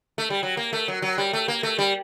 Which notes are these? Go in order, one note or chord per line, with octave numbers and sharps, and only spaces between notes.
A3
G3
F#3
A#3
A3
F#3
F#3
G3
A3
A#3
A3
G3